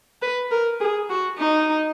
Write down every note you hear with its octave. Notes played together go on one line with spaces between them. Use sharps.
B4
A#4
G#4
F#4
D#4